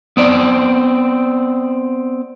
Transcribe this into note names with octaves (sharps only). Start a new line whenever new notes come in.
B3 C4 D5